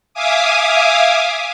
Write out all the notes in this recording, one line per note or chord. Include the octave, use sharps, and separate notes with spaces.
E5 F5 G#5 D6 D#6